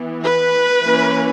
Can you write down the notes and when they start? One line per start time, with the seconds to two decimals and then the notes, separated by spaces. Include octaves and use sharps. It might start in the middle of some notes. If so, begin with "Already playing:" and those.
Already playing: E3 B3
0.22 B4
0.82 E3 A#3 C#4